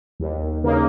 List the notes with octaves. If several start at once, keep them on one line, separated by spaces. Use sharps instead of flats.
D#2
C#3 A#3 D#4